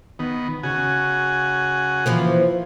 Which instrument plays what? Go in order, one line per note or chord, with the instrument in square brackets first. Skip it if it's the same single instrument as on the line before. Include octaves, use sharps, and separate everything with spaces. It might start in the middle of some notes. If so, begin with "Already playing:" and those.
[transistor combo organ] D#3 B3
C#3 F#4 G#5
[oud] E3 F3 A#3